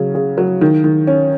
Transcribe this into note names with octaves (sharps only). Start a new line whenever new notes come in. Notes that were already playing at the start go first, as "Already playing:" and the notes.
Already playing: C#3 F#3
C#3
F#3
D#3
D#3
C#4